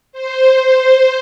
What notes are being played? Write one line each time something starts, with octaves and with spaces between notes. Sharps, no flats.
C5